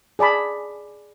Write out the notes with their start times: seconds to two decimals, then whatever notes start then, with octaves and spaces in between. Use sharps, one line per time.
0.19 G#4 D5 A5 B5